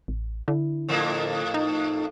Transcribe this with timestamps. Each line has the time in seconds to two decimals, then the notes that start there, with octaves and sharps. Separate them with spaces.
0.08 A1
0.48 D3 E4
0.88 F2 A2 A#3
1.54 D#4